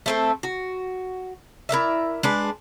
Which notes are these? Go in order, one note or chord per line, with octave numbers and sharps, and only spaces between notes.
A3 C4 A4
F#4
E4 A#4 D5 E5
G#3 D4 B4